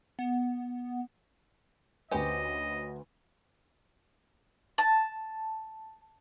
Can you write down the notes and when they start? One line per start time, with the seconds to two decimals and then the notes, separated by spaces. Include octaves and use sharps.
0.19 B3
2.11 D2 C#4 G4 B4 C5 D#5
4.78 A5